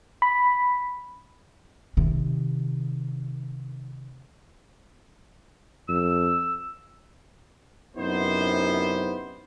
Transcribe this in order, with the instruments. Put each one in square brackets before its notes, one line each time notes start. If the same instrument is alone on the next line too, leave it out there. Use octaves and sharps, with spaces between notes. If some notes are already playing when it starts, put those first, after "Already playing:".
[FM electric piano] B5
[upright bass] C3 D#3
[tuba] F2 [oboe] E6
[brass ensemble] F#2 C3 B3 D#4 E4 C5